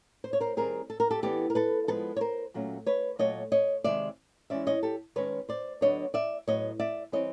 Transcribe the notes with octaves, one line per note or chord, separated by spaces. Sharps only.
C5
C#5
A#4 C5
D#3 G3 C4 G#4 A#4
A4
A#4
G4 A4
E3 G3 B3 D4 G4 A4
A#4
A4 B4
F3 G#3 B3 A4 B4
C#5
A#4 C5
A#2 F#3 A3 C#4
B4 C#5
A#2 F#3 A3 C#5 D#5
C#5 D#5
C3 D#3 G#3 D5 E5
E3 G#3 C#4 D5 E5
C#5 D#5
G4 A4
D#3 G#3 C#4 B4 C#5
C5 D5
D3 F#3 B3 D4 C#5 D#5
D5 E5
A2 F#3 B3 C#5 D#5
D5 E5
E3 G3 C4 C#5 D#5